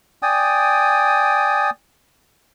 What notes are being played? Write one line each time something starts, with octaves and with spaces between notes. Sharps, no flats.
D5 G5 G#5 D#6